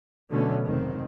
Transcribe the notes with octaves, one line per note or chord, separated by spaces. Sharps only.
B2 D3 F#3 A3 B3 C#4
F1 G#2 D#3 C4